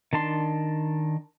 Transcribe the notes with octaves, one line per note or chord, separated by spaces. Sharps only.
D#3 D4 A5 C6